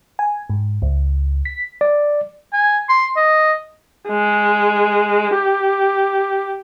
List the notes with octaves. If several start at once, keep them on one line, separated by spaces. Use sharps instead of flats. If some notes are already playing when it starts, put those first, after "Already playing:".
G#5
G#2
C#2
B6
D5
G#5
C6
D#5
G#3
G4